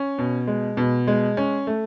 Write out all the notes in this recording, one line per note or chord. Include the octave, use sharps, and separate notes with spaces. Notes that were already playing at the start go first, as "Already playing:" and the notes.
Already playing: C#4
B2
G#3
B2
G#3
C#4
A3